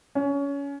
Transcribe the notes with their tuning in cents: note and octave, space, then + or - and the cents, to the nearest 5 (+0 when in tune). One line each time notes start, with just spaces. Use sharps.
C#4 +25